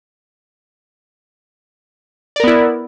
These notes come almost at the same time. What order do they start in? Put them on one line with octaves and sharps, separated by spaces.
D5 A#4 B3 E4